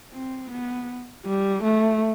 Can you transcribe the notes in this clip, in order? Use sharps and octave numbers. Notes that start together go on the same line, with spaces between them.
C4
B3
G3
A3